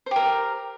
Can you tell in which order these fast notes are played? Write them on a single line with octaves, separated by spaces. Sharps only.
C5 G4 A#4